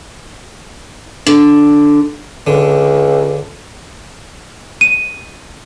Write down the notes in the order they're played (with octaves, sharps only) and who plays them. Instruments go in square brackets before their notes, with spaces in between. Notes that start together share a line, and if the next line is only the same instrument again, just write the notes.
[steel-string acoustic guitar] D3
[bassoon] C#2 [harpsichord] D3
[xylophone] D#7